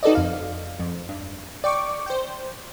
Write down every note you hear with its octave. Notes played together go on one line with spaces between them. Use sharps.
D#4 F#4 A4 B4 D5 D#5
F2 F5
F2
G2
D5 G5 C#6 D6
C5 G5